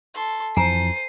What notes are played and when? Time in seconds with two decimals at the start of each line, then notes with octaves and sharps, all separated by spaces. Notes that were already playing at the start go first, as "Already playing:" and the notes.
0.15 A4 C6
0.57 F2 E3 C5 G#5 A#5 C7 D#7